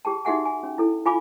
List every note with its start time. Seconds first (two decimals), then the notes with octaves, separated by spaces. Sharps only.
0.05 G4 G#4 G5 A5
0.25 D#4 F#4 G#4 E5 F#5 G#5
0.45 G#5
0.63 C#4
0.78 E4 A4
1.06 F4 F5 G#5 B5 D6